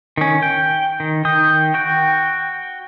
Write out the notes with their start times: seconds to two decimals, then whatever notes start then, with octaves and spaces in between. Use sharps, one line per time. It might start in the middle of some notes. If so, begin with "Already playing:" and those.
0.18 D#3 C#4
0.42 G5
1.00 D#3
1.25 D#3 G5 D#6
1.74 F#4 G5